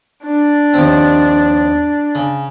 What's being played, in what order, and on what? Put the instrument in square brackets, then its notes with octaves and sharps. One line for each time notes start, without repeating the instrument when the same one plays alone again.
[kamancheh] D4
[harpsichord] D#2 F3 C4
C#3